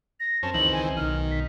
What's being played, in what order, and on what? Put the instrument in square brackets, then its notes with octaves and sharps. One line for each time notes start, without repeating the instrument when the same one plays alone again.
[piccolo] A#6
[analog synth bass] F#2 [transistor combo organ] C4 C#4 [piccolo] A5
[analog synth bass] C#2 [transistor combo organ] D#3 E3 C4 [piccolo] F#7
[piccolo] G#5
[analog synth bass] B1 [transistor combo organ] D#3 [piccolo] F6
[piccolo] B6